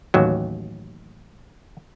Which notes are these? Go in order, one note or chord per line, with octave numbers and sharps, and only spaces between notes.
A1 D#2 F#3